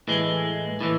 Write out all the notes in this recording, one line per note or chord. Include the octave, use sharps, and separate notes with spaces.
A2 E3 G#3
A2 E3